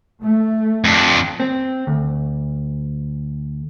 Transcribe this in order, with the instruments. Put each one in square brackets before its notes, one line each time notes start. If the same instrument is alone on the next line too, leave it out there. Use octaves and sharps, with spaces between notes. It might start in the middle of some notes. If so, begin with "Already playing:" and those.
[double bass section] A3
[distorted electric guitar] F2 D4
[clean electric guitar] C4
D2